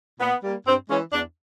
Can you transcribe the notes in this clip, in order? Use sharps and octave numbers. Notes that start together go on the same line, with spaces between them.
A#2 B3
G3 A#3
G2 C4
E3 G#3 C#4
E2 D4